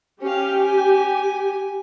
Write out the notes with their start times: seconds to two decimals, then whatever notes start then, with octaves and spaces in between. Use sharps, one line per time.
0.22 C#4 G4 F5
0.61 G#5